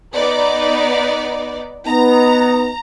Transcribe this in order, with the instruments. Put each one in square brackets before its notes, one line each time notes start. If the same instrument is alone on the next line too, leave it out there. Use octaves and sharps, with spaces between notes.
[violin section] B3 D#4 D5
[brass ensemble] B3 D#4 [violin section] A#5